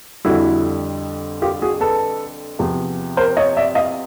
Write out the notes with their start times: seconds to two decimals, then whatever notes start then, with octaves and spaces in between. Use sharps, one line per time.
0.25 F2 D3 G3 E4 F#4
1.42 F4 G4
1.62 F#4 G#4
1.80 A4 B4
2.59 E2 C3 F3
3.17 A#4 C5
3.37 C#5 D#5
3.57 D5 E5
3.75 D#5 F5